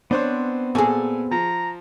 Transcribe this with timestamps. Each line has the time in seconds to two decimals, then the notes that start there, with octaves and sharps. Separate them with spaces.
0.11 B3 C4 D4 C5 C#5 F#6
0.75 A#2 F#4 G#4 A4 G#5
1.32 F3 A#5